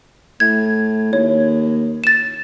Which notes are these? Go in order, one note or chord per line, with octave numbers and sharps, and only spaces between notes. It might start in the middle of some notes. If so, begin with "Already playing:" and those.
A2 G#6
D#2 C#5
A6 E7